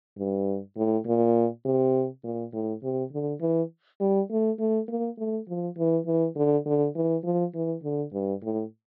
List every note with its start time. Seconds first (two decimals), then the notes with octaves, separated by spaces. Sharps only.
0.17 G2
0.76 A2
1.06 A#2
1.65 C3
2.24 A#2
2.53 A2
2.83 C3
3.12 D3
3.41 E3
4.00 G3
4.30 A3
4.59 A3
4.88 A#3
5.18 A3
5.48 F3
5.77 E3
6.06 E3
6.36 D3
6.66 D3
6.95 E3
7.24 F3
7.54 E3
7.83 D3
8.13 G2
8.43 A2